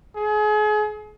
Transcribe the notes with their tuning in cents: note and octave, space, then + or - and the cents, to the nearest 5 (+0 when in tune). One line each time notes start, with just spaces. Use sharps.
G#4 +35